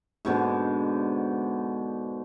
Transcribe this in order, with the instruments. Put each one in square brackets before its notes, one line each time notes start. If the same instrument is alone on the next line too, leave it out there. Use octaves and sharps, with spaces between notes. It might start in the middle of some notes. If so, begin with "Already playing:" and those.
[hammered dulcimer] G#2 B2 D3